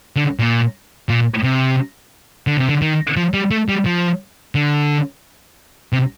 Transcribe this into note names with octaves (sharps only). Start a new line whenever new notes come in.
D3
A#2
A#2
C3
D3
C3
D3
D#3
F3
G3
A3
G3
F3
D3
C3